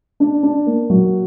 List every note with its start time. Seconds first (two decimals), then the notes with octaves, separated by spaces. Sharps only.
0.20 D4
0.43 D4
0.66 A#3
0.90 F#3